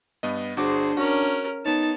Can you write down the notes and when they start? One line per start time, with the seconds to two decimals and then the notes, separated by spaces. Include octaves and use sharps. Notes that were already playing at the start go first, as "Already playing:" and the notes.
0.23 G2 B3 D#5
0.57 G1 D4 F#4 G#4 C5 D6
0.97 C#4 F#4 A#4 F#5 C#6
1.66 B3 D#4 C#5 A5